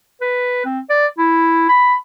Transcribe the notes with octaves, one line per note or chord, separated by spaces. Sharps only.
B4
C4
D5
E4
B5